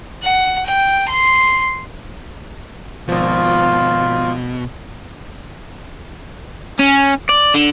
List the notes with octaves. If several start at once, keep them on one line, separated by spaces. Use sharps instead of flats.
F#5
G5
C6
G#1 B2 F3 F4
C#4
D5
D3